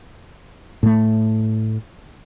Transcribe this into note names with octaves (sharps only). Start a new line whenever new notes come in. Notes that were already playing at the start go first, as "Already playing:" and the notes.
A2 A3